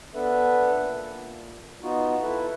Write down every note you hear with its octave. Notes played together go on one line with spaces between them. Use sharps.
B3 D4 A4 B4 E5
A#2
B3 D#4 F4 F#4
E4 A4 B4 E5